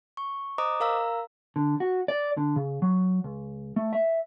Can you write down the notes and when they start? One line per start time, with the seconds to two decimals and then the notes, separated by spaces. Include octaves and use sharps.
0.17 C#6
0.58 C5 D#5 A#5 D6 D#6
0.80 A#4 F5 A#5 E6
1.56 D3
1.80 F#4
2.08 D5
2.37 D3
2.56 C#3
2.82 F#3
3.24 C#2
3.76 A3
3.93 E5